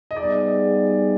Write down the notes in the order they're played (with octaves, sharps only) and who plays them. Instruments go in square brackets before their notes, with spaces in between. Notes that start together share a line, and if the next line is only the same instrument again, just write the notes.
[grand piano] D#5
[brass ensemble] G3 B3 D#4 G#4 [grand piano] D5